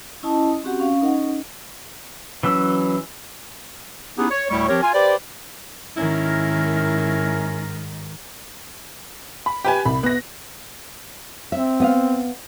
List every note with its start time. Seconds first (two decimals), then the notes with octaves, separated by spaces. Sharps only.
0.23 C#4 E4 D#5 A5 D#6
0.64 C4 C#4 F#4 G4 F#5
0.80 C#4 F5
1.00 C#4 D#4 A#4 D#5 F#5
2.43 E3 F#3 C#4 E6
4.18 B3 C#4 D#4 E4 G4 G#4
4.31 C#5
4.50 D2 A2 G3 E4 C#6
4.69 F3 C4 G4 A#4 C#5
4.82 F4 G#5
4.94 G4 B4 C5 D5
5.97 G#2 D#3 C#4 E4 A#4
9.46 B5
9.64 G4 B4 G#5
9.86 C2 B5
10.03 B3 F#6 A#6
11.52 C4 E5
11.80 B3 D#5 F5